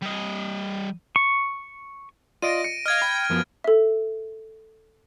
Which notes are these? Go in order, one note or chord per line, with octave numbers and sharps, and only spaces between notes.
G3 D#5
C#6
F4 D5 D#5 A#6 D7 D#7
C#7
D#5 F5 F6 G#6
G5 B5
F#2 F3 B3
A4 E5